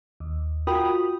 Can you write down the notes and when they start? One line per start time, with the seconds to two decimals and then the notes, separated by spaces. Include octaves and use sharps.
0.20 D#2
0.67 F4 F#4 A#4 G5 B5 D#6